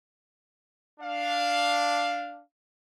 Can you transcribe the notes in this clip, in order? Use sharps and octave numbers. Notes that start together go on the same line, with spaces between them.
D4 F5